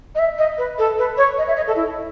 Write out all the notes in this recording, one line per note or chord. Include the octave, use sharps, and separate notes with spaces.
D#5
E5
D#5
B4
A4
B4
C#5
D#5
E5
D#5
A4
E4